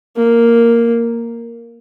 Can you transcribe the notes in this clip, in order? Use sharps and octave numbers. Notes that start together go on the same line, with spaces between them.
A#3